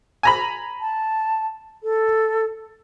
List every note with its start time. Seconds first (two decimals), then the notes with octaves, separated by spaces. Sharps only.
0.23 G#5 A#5 B5
0.81 A5
1.83 A4